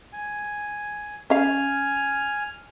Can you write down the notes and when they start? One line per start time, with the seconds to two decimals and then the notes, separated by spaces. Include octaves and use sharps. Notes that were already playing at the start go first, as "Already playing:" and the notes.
0.13 G#5
1.30 C#4 F5 G#5 F6